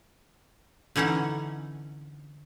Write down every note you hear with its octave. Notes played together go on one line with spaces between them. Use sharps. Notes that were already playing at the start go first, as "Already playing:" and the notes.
D3 E3 C#4 D#4 F#5